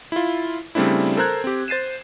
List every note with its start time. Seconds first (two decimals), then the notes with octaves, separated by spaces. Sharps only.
0.12 E4 F4
0.75 C#3 G3 A3 C4 D4 E4
1.17 A4 A#4 C5 A#5 F#6 G#6
1.44 C4 G4
1.68 C5 A6 C7 D#7 E7